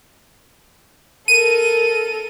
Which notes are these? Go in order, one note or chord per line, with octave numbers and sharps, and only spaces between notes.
A4 A#4 D#7